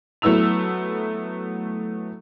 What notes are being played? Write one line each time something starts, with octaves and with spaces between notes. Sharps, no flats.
F#3 A3 B3 E4 E6 F7